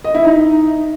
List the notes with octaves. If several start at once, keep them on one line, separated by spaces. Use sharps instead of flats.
D#5
E4
D#4